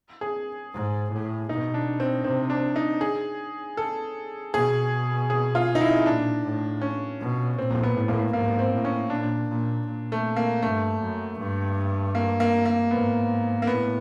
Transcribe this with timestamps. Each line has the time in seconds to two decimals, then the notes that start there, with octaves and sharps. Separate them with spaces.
0.21 G#4
0.73 G#2
1.11 A2
1.49 B2 D#4
1.74 D4
2.00 C4
2.24 C3 C4
2.50 D4
2.76 D#4
3.01 G#4
3.77 A4
4.54 B2 G#4
5.30 G#4
5.55 F4
5.75 D#4
5.81 E4
6.06 A#2 D4
6.44 A2
6.81 C#4
7.20 B2
7.58 A#2 C4
7.83 B3
7.96 A2 B3
8.09 A#3
8.33 G#2 A#3
8.59 C4
8.72 A2
8.85 C#4
9.10 A#2 D4
9.48 A#2
9.86 A#2
10.12 A3
10.37 A#3
10.62 G2 A3
11.01 F#2
11.39 G2
12.15 A#3
12.40 A#3
12.66 A#3
12.91 G#2 B3
13.62 A#3
13.67 A2 B3